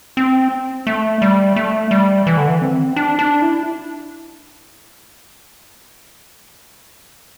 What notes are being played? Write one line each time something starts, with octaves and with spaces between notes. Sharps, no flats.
C4
A3
G3
A3
G3
E3
D3
E3
C4
D4
D4
E4